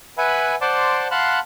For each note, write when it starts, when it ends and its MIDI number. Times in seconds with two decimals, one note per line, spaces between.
0.18 0.55 71
0.18 0.55 76
0.18 0.55 78
0.18 0.55 80
0.18 0.55 83
0.61 1.08 72
0.61 1.08 74
0.61 1.08 78
0.61 1.08 81
0.61 1.08 84
0.61 1.08 86
1.11 1.39 77
1.11 1.39 78
1.11 1.39 81
1.11 1.39 83
1.11 1.39 84
1.11 1.39 90